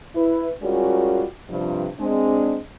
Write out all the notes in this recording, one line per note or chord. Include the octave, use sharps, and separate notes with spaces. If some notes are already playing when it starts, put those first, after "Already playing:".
E4 B4
G3 G#3 C#4 F4 F#4 A#4
G2 C3 F3
G#3 C4 D4